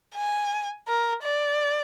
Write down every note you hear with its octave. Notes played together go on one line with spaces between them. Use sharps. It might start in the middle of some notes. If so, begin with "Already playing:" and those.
G#5
A#4
D5